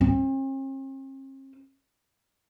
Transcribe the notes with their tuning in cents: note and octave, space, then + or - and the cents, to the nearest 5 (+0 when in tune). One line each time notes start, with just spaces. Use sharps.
C4 +45